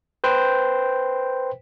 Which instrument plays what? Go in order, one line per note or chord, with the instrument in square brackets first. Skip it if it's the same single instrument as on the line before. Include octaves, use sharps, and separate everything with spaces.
[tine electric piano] B4 C5 G5